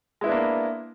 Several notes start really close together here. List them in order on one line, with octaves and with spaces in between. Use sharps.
G#3 E4 B3 D4 A#3